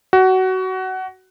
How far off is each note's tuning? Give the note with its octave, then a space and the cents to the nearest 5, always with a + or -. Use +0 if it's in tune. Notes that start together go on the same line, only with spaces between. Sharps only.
F#4 +20